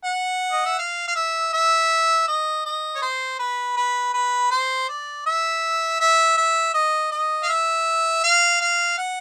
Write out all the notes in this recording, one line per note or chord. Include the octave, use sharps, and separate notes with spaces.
F#5
D#5
E5
F5
F5
E5
E5
D#5
D#5
C#5
C5
B4
B4
B4
C5
D5
E5
E5
E5
D#5
D#5
F5
E5
F5
F5
F#5